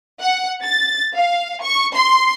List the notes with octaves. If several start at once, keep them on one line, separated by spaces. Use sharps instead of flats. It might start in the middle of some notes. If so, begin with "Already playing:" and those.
F#5
A6
F5
C#6
C6